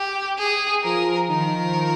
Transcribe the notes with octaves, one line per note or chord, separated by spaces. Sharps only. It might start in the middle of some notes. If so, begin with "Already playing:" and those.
Already playing: G4
G#4
F3 A#4
D#3 A#4